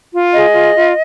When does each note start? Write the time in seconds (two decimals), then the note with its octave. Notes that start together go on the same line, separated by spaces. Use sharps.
0.13 F4
0.34 G#4 D#5
0.54 F4
0.75 F4